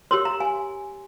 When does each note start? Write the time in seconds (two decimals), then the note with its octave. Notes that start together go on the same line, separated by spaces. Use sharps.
0.11 G4 A#4 C#5 C6
0.25 A#5
0.40 G#5